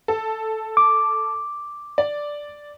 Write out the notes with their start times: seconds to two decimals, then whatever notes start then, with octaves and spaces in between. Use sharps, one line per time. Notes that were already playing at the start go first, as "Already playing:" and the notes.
0.08 A4
0.77 D6
1.98 D5